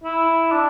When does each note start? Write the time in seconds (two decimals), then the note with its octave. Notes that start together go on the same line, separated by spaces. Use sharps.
0.04 E4
0.52 D4